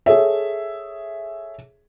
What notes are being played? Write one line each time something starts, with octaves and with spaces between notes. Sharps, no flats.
G#4 A4 C#5 E5